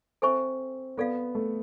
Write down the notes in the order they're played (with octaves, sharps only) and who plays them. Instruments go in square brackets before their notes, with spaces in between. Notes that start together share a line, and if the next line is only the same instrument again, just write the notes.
[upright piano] C4 [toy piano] A4 C5 E5 G#5 C#6
[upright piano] B3 [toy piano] F4 A4 D5 F5
[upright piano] A3